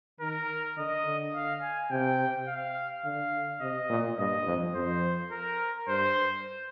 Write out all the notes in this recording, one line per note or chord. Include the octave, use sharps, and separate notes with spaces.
D#3 A#4
D3 D#5
D3
F5
G#5
C3 G5
F5
D3 F5
C3 D#5
A#2
G2 D#5
F2
F2 C5
A#4
G2 C5